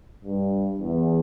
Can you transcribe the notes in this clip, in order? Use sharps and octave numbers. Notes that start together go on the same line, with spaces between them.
G2
E2